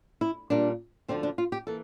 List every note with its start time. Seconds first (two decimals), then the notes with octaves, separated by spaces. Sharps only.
0.21 E4
0.50 A#2 G3 A#3 D4
1.08 D2 D3 F3 C4
1.23 D4
1.38 F4
1.52 G4
1.67 E3 A#3 A4